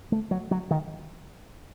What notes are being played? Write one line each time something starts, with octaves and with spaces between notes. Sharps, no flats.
A3
F#3
F#3
D#3